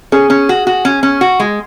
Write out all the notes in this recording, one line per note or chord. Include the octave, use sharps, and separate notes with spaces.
C#4 G#4
C#4
F#4
F#4
C#4
C#4
F#4
G#3